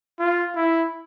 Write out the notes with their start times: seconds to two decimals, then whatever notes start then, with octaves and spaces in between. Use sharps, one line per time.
0.19 F4
0.56 E4